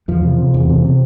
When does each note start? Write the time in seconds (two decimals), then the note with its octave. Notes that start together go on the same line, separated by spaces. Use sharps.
0.08 E2 F3
0.24 C3
0.38 C3
0.54 E2
0.69 C3
0.85 C3